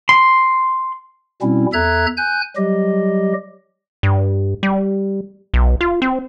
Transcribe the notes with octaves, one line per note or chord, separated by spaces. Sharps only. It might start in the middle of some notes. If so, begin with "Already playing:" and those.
C6
B2 G3 C4 C#4 E4
E2 A4 E5 A#5 F#6 G#6
G#5 F#6 G6
F#3 G3 G4 D#5
G2
G3
B1
F4
C4